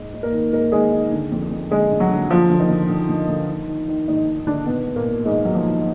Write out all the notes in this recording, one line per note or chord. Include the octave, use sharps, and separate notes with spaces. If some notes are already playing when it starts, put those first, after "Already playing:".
Already playing: G#2
G#2
A#3 A#4
D#3
G#2 A#3 A#4
D#3 G#3 G#4
D#3
D3
F2
F2
D3 G#3 G#4
D3
F#3 F#4
D3
F#2 F3 F4
D3
D#3 D#4
D3
D3
D3
D3
D#3
D#3
D#3
G#2 D#3 D#4
G#2
G#2 D3 D4
B2 D#3 B3
G#2
A#2 A#3
G#2
G#2 D#3 G#3
D#3 F#3
F3
D#3